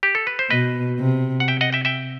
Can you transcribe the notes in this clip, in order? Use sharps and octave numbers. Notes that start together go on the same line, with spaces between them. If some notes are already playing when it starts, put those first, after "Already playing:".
G4
A4
B4
C5
B2 B4 D#5
C3
F#5
E5 G5
D#5 F#5
E5 G5
E5 G5